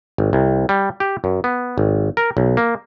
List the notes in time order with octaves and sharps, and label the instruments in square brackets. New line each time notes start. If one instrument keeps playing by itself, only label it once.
[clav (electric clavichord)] G#1
C2
G3
G4
F#2
B3
G#1
A#4
B1
A#3